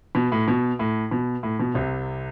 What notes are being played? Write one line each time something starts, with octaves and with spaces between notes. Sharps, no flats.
B2
A2
B2
A2
B2
A2
B2
C2 C3